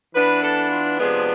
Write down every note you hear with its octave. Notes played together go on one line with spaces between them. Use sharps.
E3 B3 D4 B4
A4
F4
C3 F3 G#3 B3 D4 G#4